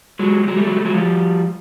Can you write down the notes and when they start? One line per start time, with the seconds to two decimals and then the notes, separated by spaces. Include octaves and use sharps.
0.19 F#3 G#3
0.43 G3
0.48 F#3 G#3
0.57 G3 A3
0.66 F#3 G#3
0.76 G3 A3
0.85 F#3 G#3
0.94 F3 G3